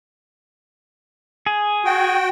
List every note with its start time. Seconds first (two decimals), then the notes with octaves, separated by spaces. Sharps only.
1.46 G#4
1.85 F#4 G5